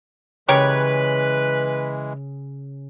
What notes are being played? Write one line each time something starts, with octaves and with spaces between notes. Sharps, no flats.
C#3 E3 G#3 G4 A#4 B4 C#5